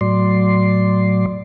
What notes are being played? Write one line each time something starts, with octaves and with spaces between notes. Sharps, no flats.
A2 F#3 D5 C6